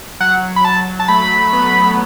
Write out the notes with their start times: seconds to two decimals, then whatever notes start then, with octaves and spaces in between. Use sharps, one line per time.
0.20 F#3 F#5
0.56 B5
0.65 A5
1.00 A5
1.08 A3 B5
1.53 B3